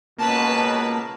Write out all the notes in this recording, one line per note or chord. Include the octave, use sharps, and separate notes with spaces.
C#2 B2 A#3 B4 A5